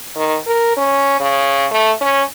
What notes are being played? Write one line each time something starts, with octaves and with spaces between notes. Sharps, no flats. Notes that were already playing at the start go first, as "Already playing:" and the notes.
D#3
A#4
C#4
C#3
A3
C#4